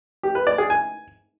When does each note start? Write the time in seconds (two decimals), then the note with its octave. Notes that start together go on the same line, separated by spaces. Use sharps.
0.23 G4
0.35 B4
0.47 D5
0.58 G#4
0.70 G#5